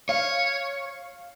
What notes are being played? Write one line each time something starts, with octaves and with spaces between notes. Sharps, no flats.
C#5 F5